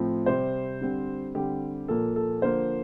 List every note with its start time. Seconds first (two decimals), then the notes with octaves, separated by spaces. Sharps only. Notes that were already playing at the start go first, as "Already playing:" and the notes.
Already playing: A2 F3 C4
0.26 C3 G3 C4 C5
0.81 D3 G3 C4
1.35 D3 G3 C4 G4
1.88 A#2 F3 A#3 A4
2.16 A4
2.42 D3 F3 A#3 C5